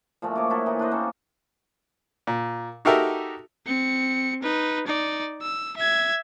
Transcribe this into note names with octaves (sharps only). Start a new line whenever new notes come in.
A#2 F3 G#3 A3
A4 C#5 D#5 D6
E4 F#4 A4 A#4
A#2 E3 D#4
D4 B4 C5 D#5
A#3 C4 C#4 A4
A#2
D#4 F#4 G4 A4 A#4 E5
C4 C#7
D#4 B4
D#4 D5
E6
E5 G#6